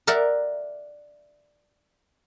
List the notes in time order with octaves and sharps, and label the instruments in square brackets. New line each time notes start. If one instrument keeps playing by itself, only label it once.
[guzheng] A#4 D5 E5 F#5